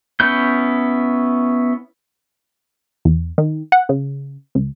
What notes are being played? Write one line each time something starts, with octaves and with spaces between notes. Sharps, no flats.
B3 C#4 E4 G6
E2
D#3
F#5
C#3
C#2